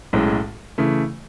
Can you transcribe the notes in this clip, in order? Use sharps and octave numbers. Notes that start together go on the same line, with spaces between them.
B1 A2 G#3 C#4
C#3 E3 A3